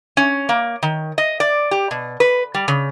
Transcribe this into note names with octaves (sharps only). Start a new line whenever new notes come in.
C#4
A#3
D#3
D#5
D5
G4
B2
B4
G3
C#3